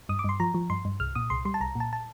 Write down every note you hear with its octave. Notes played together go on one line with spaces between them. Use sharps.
G2 D#6
D6
G2 C6
F3 A#5
F3
G2 C6
G2
C2 F6
A#2 D#6
C2 C6
G3 C6
A5
C2 A#5
A#2 A5
A5